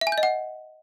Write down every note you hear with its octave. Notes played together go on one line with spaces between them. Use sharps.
E5
G#5
G6
D#5
F#5